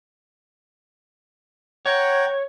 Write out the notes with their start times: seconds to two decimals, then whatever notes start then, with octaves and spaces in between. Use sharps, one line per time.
1.86 C#5 F#5 G5 A#5